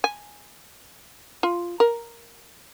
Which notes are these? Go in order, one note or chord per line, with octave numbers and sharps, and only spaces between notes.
G#5
F4
A#4